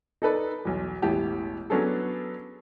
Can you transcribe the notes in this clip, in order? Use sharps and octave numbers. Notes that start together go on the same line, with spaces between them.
D#4 A4 B4 D5
B1 E2
E1 A1 E3 G4 A5
F#3 B3 C#4 D4 G#4 A4